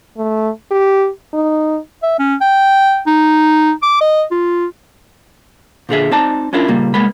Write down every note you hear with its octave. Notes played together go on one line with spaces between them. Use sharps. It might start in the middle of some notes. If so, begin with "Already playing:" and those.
A3
G4
D#4
E5
C#4
G5
D#4
D6
D#5
F4
A#2 D3 G#4 E5
C4 D#4 D5 A5 A#5
C#4 D4 E4 F4 A#4
A#2 C#3 G3 A#3
C2 G#3 A#3 B3 B5